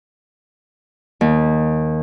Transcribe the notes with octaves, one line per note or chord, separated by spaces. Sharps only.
D#2